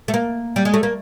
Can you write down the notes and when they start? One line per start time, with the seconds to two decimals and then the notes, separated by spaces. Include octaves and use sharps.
0.08 A3
0.14 A#3
0.56 G3
0.65 G#3
0.74 A3
0.83 A#3